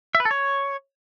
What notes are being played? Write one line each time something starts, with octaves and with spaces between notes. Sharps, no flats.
E5
B4
A4
C#5